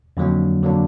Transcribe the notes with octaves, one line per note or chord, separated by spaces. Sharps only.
F2 D3 F#3 A#3 D4
D3 F#3 A#3 D4